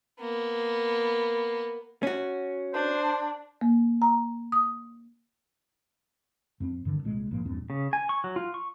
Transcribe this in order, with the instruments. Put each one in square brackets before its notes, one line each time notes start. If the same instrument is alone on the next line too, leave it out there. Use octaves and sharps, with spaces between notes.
[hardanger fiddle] A#3 B3
[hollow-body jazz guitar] C#4 F#4
[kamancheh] D4 [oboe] C5
[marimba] A#3
A#5
D#6
[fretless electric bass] F2 A#3 C4
G2 D3 D#3
C2 A#2 G#3
A#1 G#2 F3 A#3
E2 G2 A#2 C4
[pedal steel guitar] C#3
G#5
C#6
F#3
F4
C#6